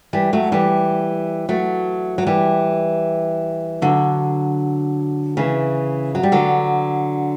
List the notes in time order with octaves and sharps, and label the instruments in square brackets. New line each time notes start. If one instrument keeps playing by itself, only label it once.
[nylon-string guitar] E3 G3
F#3 A3
E3 G3
F#3 A3
F#3
E3 G3
D3 F#3
C#3 E3
F#3
G3
D3 F#3